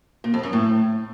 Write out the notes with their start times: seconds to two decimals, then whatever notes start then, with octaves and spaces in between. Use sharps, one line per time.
0.24 A#2
0.34 F2
0.43 F#2
0.53 A2